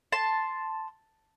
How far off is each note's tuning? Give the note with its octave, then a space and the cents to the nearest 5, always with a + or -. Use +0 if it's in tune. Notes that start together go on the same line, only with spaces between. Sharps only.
A5 +0 C6 +0